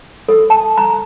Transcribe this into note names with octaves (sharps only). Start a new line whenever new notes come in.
A4
A5
A#5